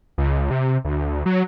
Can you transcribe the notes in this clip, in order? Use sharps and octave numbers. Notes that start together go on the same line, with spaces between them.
C#2
C3
D2
F#3